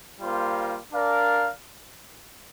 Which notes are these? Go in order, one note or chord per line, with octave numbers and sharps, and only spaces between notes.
G3 A#3 F4 C5
D4 A#4 D5 F5